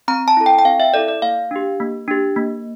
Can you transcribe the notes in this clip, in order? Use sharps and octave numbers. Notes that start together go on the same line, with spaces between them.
C4 A#5
A5
E4 A4
G5
G5
C4 F5
E5
E4 A4 D5
D5
A#3 F5
D4 G4
A#3
D4 G4
A#3